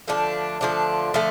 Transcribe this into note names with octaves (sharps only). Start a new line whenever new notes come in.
D3 F3 A3 D4
D3 F3 A3 D4
D3 F3 A3